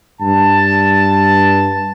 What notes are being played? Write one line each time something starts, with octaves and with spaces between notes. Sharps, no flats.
G2 A5